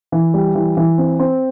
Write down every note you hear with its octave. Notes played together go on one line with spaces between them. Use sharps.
E3
G3
E3
E3
C4
C4